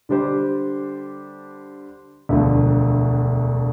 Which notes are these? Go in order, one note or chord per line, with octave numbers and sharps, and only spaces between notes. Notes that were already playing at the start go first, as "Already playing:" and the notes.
D3 G3 D4 G4 C5
E1 D2 D3 F3 A3